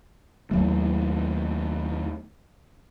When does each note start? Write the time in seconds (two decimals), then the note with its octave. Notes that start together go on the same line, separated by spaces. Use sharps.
0.51 D#2 F#3 A3